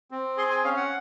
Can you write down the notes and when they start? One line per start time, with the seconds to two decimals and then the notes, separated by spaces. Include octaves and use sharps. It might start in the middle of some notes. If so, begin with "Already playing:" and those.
0.11 C4
0.37 G#4 C6
0.51 G#5
0.64 C#4 F5
0.77 F#5